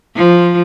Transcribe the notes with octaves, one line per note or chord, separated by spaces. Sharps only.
F3